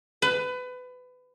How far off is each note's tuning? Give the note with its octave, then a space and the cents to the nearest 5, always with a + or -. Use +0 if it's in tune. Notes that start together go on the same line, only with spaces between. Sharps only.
B4 +25